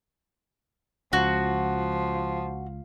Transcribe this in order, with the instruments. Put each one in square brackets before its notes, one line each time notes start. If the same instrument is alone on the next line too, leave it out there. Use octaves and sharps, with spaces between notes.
[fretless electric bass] C#2 [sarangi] F3 [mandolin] F#4